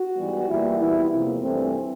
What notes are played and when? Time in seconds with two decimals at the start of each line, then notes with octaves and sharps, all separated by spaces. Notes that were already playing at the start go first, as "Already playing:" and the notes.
Already playing: F#4
0.16 G#2 E3 G3 B3
0.48 A#2 E3 G3 A#3 E4
0.79 A#2 E3 G3 B3 E4
1.10 E2 C3 F3 A#3
1.41 G2 E3 A3 C4